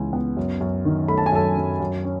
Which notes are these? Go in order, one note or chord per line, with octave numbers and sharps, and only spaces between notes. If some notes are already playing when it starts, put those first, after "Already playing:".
Already playing: C#2 C#3 E3 B3 G#5
B3
F#2
F#2
D#3
A3 B5
A5
G#5
F#2 A4 A5
F#2
F#2
C#4